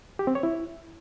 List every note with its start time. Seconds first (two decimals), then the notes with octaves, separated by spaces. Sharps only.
0.19 G4
0.27 C4
0.35 C#5
0.43 E4